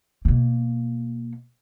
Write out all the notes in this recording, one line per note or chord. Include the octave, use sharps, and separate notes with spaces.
B2 A#3